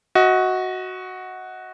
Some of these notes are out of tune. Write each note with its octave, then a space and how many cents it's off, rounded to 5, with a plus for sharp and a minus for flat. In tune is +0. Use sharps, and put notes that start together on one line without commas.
F#4 +0 D#5 +30